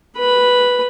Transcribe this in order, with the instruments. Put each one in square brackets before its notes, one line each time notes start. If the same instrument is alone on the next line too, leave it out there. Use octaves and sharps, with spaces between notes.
[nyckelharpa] B4 B5